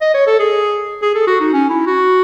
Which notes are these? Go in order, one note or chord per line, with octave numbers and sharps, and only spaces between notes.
D#5
C#5
A4
G#4
G#4
A4
F#4
D#4
C#4
E4
F#4